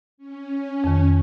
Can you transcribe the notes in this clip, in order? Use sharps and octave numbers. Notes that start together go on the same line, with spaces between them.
C#4
F2 D#3